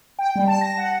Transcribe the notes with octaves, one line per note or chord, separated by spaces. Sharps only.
G5
G3
A5
A#6
F#5